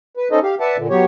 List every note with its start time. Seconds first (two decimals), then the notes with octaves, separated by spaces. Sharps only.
0.17 B4
0.31 C#4 D#4 A4 C5 D#5
0.43 G4 F5
0.60 B4 D5 E5 F#5 A5
0.77 A#2 D3
0.90 F#3 B3 G4 C#5